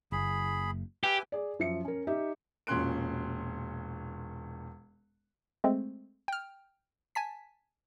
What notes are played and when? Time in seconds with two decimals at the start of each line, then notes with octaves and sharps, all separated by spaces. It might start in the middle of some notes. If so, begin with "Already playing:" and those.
0.12 F#1 G#4 B5
1.04 G4 B4 E5 G#5
1.32 G#4 D5
1.59 F#2 F3 E5 C#7
1.85 C#4 A#4
2.07 D#4 G4 E5
2.67 E1 A#2 C#4 C6 F#6 D7
5.64 G#3 A3 C4
6.28 G5 F6
7.15 G#5 A5 B6